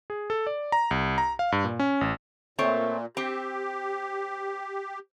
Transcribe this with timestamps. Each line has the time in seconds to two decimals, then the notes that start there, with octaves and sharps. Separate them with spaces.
0.10 G#4
0.30 A4
0.47 D5
0.72 A#5
0.91 C2
1.18 A#5
1.39 F5
1.52 G2
1.64 A#2
1.79 C#4
2.01 A1
2.59 A#2 A3 C4 C#5
3.17 C4 G4